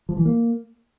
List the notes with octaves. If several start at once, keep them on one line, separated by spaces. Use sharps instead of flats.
F3
E3
A#3